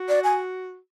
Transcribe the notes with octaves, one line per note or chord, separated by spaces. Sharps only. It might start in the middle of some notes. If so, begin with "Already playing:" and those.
Already playing: F#4
D5
G#5